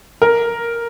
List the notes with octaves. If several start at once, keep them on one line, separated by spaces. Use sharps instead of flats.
A#4